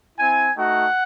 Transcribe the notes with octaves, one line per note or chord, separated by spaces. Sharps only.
C4 E4 G#5
A3 D#4 F#4 F#5